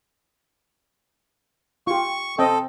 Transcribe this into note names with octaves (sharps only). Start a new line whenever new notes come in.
F4 G4 C#6
C4 A4 D#5 G5